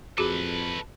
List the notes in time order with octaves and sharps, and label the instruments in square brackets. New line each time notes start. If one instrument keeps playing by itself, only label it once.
[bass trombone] F2 [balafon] F#4 G#4 [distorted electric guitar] A4 B4